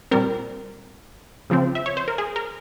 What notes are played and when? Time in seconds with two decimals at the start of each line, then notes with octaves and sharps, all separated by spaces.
0.11 A#2 G3 C4 A#4
1.50 C#3 F3 C4
1.75 E5
1.86 C#5
1.97 C5
2.08 A#4
2.18 G#4
2.36 A#4